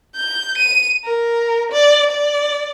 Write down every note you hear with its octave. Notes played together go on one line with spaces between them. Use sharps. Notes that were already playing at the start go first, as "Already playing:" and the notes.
G6
D#7
A#4
D5
D5